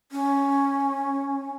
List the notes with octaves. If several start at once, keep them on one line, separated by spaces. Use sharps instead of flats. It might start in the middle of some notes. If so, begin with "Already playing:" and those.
C#4